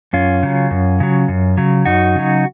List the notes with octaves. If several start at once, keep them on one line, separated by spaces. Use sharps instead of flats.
F#2 C#4 F4
C#3 F#3
F#2
C#3 F#3
F#2
C#3 F#3
F#2 D#4 F#4
C#3 F#3